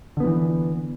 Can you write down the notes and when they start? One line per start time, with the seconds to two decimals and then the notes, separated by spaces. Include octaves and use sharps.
0.17 D3
0.20 B3
0.24 F3
0.27 E3